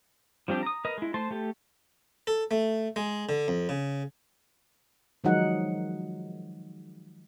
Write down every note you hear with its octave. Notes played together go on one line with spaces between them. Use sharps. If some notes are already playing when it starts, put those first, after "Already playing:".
F3 G3 C4 D4 G4
A#5 D#6
A#4 B4 D#5
G#3 E4
A3 C5 A5 C6
A3 G4 A4
A4
A3
G#3
D3
F2
C#3
D#3 F3 F#3 G#3 D#4 F#5